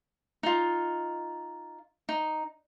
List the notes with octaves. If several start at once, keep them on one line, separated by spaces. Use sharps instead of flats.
D#4 F4
D#4